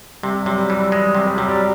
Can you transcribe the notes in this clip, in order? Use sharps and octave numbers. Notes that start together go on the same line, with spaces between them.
C3 G3
C3 F#3
G3
E3
G#3
C3
G3
C3 F#3
G3